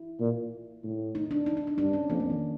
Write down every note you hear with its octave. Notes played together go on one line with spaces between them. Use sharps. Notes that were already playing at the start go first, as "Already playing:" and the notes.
Already playing: E4
A#2
A2
D#4
D4
D#4
D#4
D4
G2 D4
C#4
F2 A#3
A3
D#3